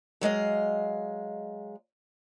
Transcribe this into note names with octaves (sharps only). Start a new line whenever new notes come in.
F#3 G#3 D#5 F5